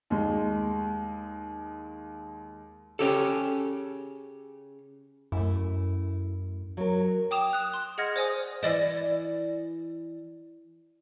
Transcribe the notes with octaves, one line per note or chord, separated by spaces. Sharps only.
D#2 G#3
C#3 C#4 G4 A4
F#2 A3 E4
F#3 A#4
G5 D6 D#6 E7 F7
D#6 F#6
C6
G#4 D#5 F#5 F6 G#6 A#6
C5 D5 G#5 D#6
E3 D5 D#5